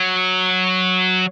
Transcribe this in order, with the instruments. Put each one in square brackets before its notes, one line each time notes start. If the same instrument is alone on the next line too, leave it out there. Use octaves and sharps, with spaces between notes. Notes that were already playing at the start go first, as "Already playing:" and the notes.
Already playing: [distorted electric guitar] F#3